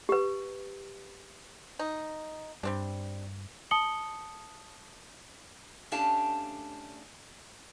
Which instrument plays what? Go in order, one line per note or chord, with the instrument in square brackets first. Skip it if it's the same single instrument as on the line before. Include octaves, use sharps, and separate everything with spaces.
[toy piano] G4 B4
[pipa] D#4
[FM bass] G2 [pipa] G3 C4 D4
[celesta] A5 D#6 C#7 F#7 G7
[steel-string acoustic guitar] A3 C#4 D4 G4 F5 A5